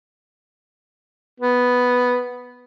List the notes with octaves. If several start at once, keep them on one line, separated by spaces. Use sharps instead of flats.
B3